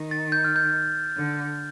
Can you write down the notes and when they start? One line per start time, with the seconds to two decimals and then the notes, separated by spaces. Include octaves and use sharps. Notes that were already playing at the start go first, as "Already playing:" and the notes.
Already playing: D#3
0.11 A6
0.32 G6
0.44 F6
0.56 G6
1.17 D3